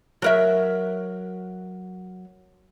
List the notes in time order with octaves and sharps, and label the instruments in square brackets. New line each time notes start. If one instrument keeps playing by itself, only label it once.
[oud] F#3 A#4 E5